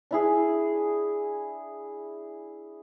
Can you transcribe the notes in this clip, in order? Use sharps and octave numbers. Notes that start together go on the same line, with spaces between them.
D4 E4 G#4